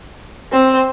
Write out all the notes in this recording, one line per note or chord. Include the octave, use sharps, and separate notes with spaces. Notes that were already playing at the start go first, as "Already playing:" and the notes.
C4